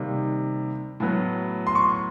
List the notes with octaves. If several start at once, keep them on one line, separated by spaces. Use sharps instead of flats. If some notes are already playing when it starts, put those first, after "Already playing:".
Already playing: C3 D#3 G3 A#3
A2 F#3 B3
C6
C#6